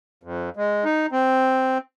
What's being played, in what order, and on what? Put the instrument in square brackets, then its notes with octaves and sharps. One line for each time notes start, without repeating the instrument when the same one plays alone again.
[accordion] F2
G#3
D#4
C4